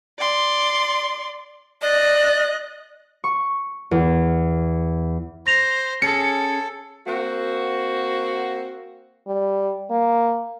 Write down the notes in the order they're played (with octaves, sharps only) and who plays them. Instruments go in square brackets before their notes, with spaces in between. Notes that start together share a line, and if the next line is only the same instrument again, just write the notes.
[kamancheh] D5 C6
[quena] D5 [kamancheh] D#5 F#6
[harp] C#6
E2
[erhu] C5 [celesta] A#6 F7
[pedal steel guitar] C#4 G#4 [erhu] A4 [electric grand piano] C#7
[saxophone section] A#3 C4 F#4
[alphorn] G3
A#3